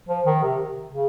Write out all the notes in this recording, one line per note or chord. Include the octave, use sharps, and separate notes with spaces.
F3
D#3
C3
C#3